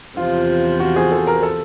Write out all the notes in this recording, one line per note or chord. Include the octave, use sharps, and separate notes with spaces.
E2 C3 F3 F4
F#4
G#4
A4
A#4
A4